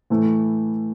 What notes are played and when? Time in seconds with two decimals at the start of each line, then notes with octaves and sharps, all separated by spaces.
0.10 A2 E3 A3